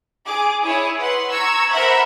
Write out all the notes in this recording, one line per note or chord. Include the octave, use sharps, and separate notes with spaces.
G#4 D6
E4 G#4 C#5
B4 F#5 C6
A#5 C#6 E6 G#6
A#4 C5 E5 F#5 B5